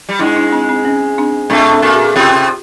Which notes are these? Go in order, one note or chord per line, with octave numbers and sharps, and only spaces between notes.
G3
G#2 G#3 D4 E4
D4 E4
C4 D4
C4
C#4
C4 D4
A2 A3 C4 D4
C4 D4
A#2 A#3
F#4 G#4
G#4
C3 C4 F4 G4